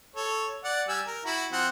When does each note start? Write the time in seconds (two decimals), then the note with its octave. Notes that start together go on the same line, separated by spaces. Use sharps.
0.16 A4 C#5
0.64 D5 F#5
0.88 G3 G#5 E6
1.07 A#4
1.25 E4 F#4
1.52 F3 C4 F#5